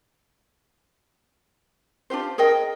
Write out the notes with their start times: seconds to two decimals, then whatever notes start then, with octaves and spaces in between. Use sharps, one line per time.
2.10 D4 F4 G4 C5
2.38 G#4 A#4 D#5 G5